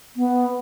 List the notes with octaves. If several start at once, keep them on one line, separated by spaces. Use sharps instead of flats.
B3